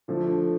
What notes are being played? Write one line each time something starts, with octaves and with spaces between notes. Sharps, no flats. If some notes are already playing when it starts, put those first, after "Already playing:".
D3 F3 A3